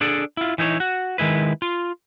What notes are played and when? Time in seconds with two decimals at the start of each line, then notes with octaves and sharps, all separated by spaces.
0.01 D4 G#4 A4 D5
0.37 E4 F4
0.58 E3 D#4 E4 A4 C#5
0.80 F#4
1.18 D#3 G#3 E4 B4
1.62 F4